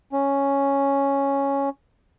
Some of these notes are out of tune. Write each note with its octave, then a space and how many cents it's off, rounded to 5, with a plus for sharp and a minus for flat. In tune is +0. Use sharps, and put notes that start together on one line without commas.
C#4 +0